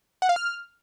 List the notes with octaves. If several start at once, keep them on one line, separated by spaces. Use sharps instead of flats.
F#5
F5
F6